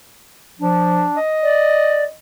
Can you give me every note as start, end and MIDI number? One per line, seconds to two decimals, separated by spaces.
0.59 1.07 53
0.59 1.17 62
1.17 2.14 75
1.42 2.04 74